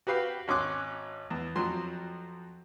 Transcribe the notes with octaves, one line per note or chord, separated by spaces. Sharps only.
F#4 G4 B4 F5 G5
G#1 C#4 C6 D6 F#6
E2
F2 F3 F#3 C6